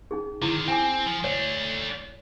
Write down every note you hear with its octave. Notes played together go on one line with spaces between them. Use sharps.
C#4 D#4 G#4
D3 D#3 E4
C4 G5 G#5 D6
F3
A3 D4 C#5